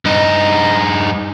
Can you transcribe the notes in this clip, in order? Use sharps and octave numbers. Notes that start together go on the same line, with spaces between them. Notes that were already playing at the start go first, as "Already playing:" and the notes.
G2 D#4